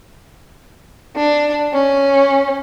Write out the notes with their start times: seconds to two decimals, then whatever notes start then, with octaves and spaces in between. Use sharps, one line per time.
1.15 D4
1.72 C#4